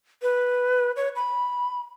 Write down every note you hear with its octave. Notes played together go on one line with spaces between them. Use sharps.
B4
C#5
B5